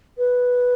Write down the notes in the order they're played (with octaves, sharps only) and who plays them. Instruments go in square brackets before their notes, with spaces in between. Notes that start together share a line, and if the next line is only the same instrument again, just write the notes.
[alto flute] B4